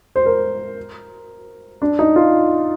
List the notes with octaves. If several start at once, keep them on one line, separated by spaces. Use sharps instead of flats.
C5
A#4
D4
D#4
F4